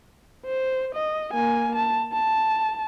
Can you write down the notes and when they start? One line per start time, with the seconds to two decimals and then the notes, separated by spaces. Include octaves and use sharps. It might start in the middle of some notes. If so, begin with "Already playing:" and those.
0.46 C5
0.95 D#5
1.33 A#3 G#5
1.76 A5
2.13 A5